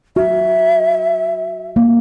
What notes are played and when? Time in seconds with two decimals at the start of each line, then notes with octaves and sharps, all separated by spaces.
0.16 F#4 E5
1.76 A#3